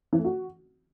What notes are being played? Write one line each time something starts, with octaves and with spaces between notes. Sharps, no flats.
E3
A3
F#4